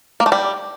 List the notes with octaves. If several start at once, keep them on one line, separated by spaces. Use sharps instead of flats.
A#3
A3
G3